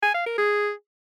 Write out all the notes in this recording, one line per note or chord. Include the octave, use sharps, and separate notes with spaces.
G#5
F5
A#4
G#4